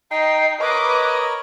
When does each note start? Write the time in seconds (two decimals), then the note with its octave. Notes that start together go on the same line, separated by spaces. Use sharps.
0.11 D#4 G5 C7
0.61 A#4 B4 C#5 D#5 B5 D6